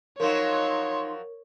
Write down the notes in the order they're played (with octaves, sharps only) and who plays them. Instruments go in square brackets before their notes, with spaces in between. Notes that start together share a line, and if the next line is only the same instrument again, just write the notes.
[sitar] F3 F#3 [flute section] D#4 C6 [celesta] A#4 [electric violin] C#5